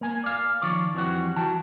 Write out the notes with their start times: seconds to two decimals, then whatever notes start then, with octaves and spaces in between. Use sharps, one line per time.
0.01 A#3 G#5
0.24 D5 F5
0.62 D#3 F3 C#5 D5
0.94 F2 E3 F3 G3 F#4
1.36 E3 F#4 G5 A5